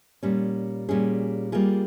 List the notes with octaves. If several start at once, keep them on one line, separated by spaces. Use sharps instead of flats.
A#2 G3 C#4
A#2 G3 C#4 G#4
G3 A#3 F4 G#4